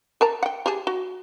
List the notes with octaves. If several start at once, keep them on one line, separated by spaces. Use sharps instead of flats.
A#4 A5 A#5
F#5 G5
G4 G#4 A5
F#4